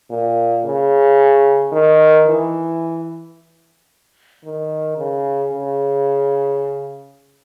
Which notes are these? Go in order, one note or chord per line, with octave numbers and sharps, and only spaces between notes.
A#2
C#3
D#3
E3
D#3
C#3
C#3